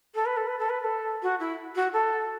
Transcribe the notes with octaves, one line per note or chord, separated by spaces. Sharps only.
A4
B4
A4
B4
A4
B4
B4
A4
F#4
E4
F#4
A4